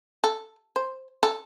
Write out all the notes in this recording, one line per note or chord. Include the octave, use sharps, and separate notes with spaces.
A4
C5
A4